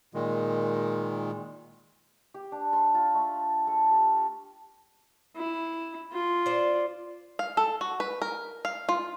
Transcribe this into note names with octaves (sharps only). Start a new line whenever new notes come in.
A#2 D#3 G#3
G4
D4
C6
F4
A3
A4
G4
E4
F4
C5 D5
F5
A4
F#4
B4
A#4
F5
F4